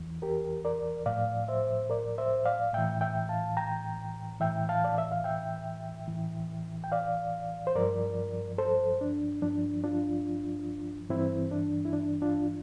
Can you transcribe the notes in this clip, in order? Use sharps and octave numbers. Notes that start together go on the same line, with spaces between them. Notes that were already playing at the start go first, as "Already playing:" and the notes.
Already playing: E2 E3
G4 A#4
A#4 D5
A2 F3 D5 F5
C5 E5
A#4 D5
C5 E5
D5 F5
A2 E3 E5 G5
E5 G5
F5 A5
G5 A#5
A2 E3 E5 G5
F5 A5
D5
E5
F5
E5 G5
A2 E3
G5
D5 F5
C5
G2 F3 A#4 D5
A4 C5
D4
G2 F3 D4
D4 F4
G2 E3 C4 E4
D4
E4
D4
D4 F4